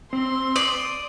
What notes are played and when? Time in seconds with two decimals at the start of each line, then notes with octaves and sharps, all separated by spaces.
0.13 C4 C6
0.56 D5 D#6